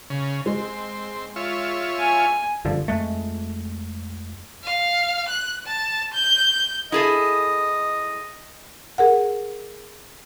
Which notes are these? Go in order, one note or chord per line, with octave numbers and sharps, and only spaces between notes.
C#3
G#3 C4
F4 C#5 E5
G#5
F#1 G2 D3 F3
F2 G#3 A3
F5
F#6
A5
G6
E4 G#4 A4 D#5
G#4 A#4 F#5